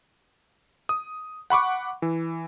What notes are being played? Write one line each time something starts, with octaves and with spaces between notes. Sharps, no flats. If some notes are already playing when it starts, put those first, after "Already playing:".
D#6
F#5 B5 C#6 D6
E3